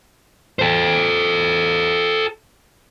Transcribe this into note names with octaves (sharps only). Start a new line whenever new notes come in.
A4 C5